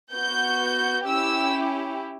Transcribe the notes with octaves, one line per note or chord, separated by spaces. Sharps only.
B3 F#4 G6
C#4 E4 G4 E6